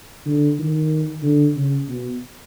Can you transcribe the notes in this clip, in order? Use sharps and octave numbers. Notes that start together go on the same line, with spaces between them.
D3
D#3
D3
C#3
B2